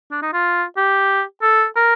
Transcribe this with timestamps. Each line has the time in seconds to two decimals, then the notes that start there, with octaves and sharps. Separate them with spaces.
0.11 D4
0.22 D#4
0.33 F4
0.77 G4
1.43 A4
1.76 A#4